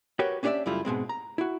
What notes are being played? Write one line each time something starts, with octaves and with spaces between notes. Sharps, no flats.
F#4 G4 A#4 B4 C#5 G5
C#4 D4 G4 C#5 D5 E5
F#2 C#3 G3 A3 E4 F4
G#2 B2 G#3 C4
A#5
E4 F#4